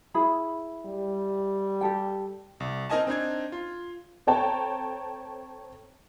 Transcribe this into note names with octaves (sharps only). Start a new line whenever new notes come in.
E4 G#4 B5
G3
G4 A4 G5
C2
C4 D#4 A#4 D#5 G#5 A5
C4 D4 D#4 G#6
F4
C4 A4 C#5 G5 A5 A#5